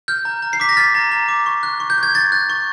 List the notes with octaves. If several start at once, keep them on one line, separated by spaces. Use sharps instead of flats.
F6 G6
A#5
A#5
C7
D6 B6
A#6
F6 A6
A#5
A#5
D6
C#6
F#6
C#6
G6
F#6
G#6
C#6 A6
F#6
C#6